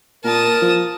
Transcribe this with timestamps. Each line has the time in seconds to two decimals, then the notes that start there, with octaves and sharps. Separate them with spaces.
0.24 A#2 A#4 A5 D#6
0.62 F3